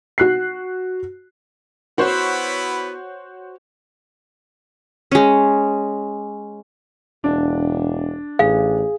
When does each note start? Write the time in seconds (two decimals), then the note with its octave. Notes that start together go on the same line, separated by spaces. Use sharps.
0.18 F#4 F#6 C7
1.98 B3 E4 F#4 C5 C#5
5.11 G#3 C#4
7.24 E1 D4
8.39 A1 G#4 F5